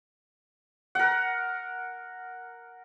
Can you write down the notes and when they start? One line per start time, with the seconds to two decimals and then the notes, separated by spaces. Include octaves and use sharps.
0.95 A#4 F#5